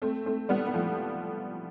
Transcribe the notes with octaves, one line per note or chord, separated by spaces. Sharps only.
A3 C4
A3 C4
G3 B3
B3
F3 A3